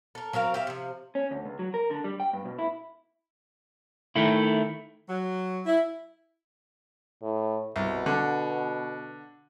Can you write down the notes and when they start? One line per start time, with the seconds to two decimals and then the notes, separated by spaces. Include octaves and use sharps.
0.15 A4 A#4
0.33 F#3 C4 A#4 F5
0.54 G4 E5 F5
0.67 C3 F3
1.15 C#4
1.31 D2
1.46 C#2
1.59 F#3
1.74 A#4
1.91 D3
2.04 G3
2.20 G5
2.33 G2
2.45 B2
2.59 E4
4.16 D#3 A3 E4
5.09 F#3
5.66 E4
7.22 A2
7.76 C2 B2
8.06 D3